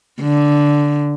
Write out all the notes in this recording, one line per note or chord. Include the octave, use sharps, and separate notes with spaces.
D3